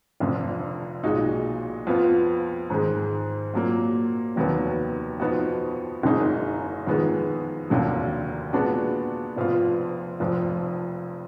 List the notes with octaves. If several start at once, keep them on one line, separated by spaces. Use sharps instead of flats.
F1 F2 D3 F3
B1 A#2 G#3 D#4 F#4
F2 F3 B3 F4
G#2 D#3 G#3
A#2 F#3 A#3
F1 D#2 D#3 F#3 B3
F2 F3 B3 D#4 F#4
F#1 F#2 D3 G#3 D#4
F2 D#3 G#3 B3
F1 D#2 D3 F#3
A#2 G#3 B3 D4 F#4
F1 F2 F3 B3 F4
F1 F2 F3